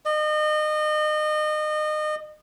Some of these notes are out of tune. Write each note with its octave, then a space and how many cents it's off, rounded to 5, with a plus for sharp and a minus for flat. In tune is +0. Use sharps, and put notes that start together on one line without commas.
D#5 -30